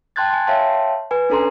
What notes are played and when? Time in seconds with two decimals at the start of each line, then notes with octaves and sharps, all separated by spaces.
0.16 G5 A5 C6 F#6 G#6 A6
0.30 G#5 C6
0.47 C#5 E5 F5 G5 A5 C6
1.11 B4 G#5
1.30 C#4 D4 A4 A#5 C6